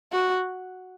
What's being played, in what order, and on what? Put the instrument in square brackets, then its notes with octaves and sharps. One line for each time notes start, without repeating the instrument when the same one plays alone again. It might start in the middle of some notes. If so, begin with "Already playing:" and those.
[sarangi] F#4